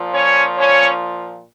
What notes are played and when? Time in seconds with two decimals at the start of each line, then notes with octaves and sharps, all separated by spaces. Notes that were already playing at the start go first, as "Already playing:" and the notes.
Already playing: A#2 F3
0.12 C#4 C#5
0.56 C#4 C#5